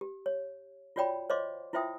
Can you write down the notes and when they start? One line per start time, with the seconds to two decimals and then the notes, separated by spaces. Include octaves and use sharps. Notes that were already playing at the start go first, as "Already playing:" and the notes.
0.01 G4
0.26 C#5
0.96 F4 F#4 C#5 D5 G5 B5
1.30 C5 C#5 D#5 F5 C6 D6
1.73 E4 F4 C5 E5 G5 D#6